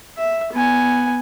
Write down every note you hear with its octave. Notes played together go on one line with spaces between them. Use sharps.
E5
B3 G#5